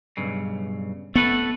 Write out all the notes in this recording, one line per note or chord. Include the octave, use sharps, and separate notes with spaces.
B1 G2 C#3
A3 B3 A4 B4